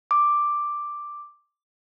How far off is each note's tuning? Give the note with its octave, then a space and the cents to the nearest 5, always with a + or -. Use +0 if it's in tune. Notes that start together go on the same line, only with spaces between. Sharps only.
D6 +5